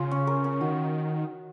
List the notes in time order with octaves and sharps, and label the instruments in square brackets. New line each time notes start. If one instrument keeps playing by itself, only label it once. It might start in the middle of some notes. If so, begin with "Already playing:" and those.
Already playing: [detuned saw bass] C#3 [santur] F4
[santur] C#4
A#4
C#4
[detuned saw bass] D#3 [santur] F#4